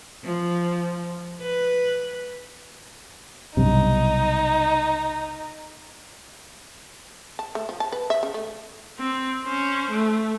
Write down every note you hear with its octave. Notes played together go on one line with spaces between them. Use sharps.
F3
B4
B1 G2 C3 D#4
A5
A3
F3
A5
B4
E5
C#3
A3
C4
C#4 C5
A3